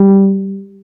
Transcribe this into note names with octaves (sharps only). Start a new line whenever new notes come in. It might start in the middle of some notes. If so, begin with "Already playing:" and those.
Already playing: G3